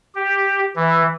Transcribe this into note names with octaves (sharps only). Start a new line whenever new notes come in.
G4
E3